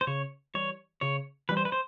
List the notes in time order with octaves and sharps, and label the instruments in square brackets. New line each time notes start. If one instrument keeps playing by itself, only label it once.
[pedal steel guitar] C5
[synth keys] C#3 [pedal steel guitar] C#5
[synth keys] E3 G3 [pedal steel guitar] C#5
[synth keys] C#3 [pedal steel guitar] C#5
[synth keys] E3 G3 [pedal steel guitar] B4
[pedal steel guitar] C5
B4
C5